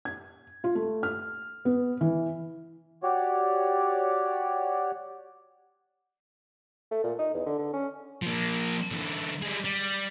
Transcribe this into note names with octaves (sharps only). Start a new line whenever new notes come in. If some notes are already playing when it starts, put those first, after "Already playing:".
G#6
F4
A3
F6
B3
E3
F#4 G4 C#5 D5
A3
A#2
D#4
E2
D3
D3
C#4
F3 A#3
D3 E3
G3 G#4
G3